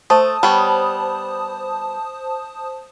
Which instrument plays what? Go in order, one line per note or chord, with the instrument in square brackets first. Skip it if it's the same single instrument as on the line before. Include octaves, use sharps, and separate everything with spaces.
[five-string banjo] A3 [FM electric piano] C5 A5 D#6
[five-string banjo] G3 B3 C#5